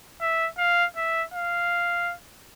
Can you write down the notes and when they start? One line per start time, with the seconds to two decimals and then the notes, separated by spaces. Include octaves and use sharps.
0.21 E5
0.58 F5
0.97 E5
1.34 F5